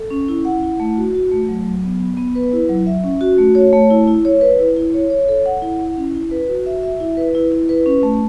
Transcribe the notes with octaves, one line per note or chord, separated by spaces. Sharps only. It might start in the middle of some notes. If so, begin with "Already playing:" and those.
Already playing: A4
C#4
E4
F#5
E4
A3
F#4
F#4
A3
F#3
F#3
B3
B3
B3
B4
E4
F#3
E5
C#4
F#4
A3
C#5
A3
E4
E4
C#5
B4
E4
E4
C#5
C#5
A4
F#5
E4
E4
C#4
E4
B4
F#4
E5
E5
E4
B4
E4
E4
B4
C#4
A3